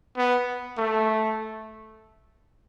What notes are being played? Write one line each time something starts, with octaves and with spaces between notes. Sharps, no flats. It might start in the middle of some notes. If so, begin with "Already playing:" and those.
B3
A3